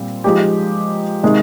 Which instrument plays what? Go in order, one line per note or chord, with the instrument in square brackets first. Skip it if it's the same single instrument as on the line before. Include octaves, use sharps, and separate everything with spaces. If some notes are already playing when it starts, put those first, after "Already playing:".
Already playing: [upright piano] A#2 G3 C4
F3 G#3 D#4 G4
C3 D#3 G#3